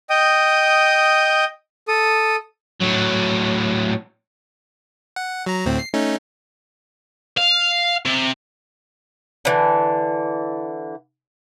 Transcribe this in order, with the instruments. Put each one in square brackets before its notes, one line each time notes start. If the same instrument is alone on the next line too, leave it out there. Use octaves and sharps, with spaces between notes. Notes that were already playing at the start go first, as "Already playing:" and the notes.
[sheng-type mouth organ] D#5 G5 D#6
A4 D#6
[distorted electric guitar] A2 F#3
[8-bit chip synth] F#5
F#3 A#5
D2 A2 C4
C7
A3 C#4 D#4
[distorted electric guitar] F5
C3
[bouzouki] D3 E3